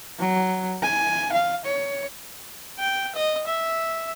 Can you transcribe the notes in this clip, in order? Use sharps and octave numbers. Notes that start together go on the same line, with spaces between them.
F#3
G#5
F5
C#5
G5
D#5
E5